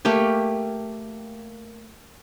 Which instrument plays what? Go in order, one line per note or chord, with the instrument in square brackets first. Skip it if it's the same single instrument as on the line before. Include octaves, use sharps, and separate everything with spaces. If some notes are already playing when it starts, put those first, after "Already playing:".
[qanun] A3 A#3 G4